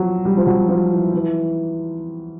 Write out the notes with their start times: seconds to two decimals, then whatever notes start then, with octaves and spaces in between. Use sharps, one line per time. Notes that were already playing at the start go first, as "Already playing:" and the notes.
Already playing: F3 F#3
0.25 G3
0.37 F3
0.47 F#3
0.69 F3
0.92 E3
1.14 E3